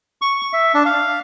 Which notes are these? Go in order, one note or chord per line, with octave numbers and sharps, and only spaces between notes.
C#6
E5
D4
F5